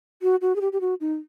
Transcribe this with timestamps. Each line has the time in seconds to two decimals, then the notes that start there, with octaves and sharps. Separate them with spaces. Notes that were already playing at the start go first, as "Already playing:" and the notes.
0.22 F#4
0.42 F#4
0.56 G#4
0.61 G4
0.73 G4
0.81 F#4
1.01 D#4